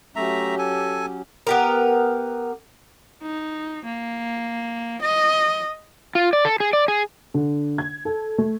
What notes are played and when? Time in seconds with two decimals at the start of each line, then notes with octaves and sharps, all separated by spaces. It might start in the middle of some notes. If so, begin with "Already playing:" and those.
0.16 F#3 A3 C#4 G4 E5 A#5
0.58 A4 G#5
1.47 B3 G4 A#4
3.22 D#4
3.85 A#3
5.02 D#5
6.15 F4
6.33 D5
6.45 A4
6.60 G#4
6.73 D5
6.88 G#4
7.34 D3
7.78 G#6
8.05 A4
8.38 A3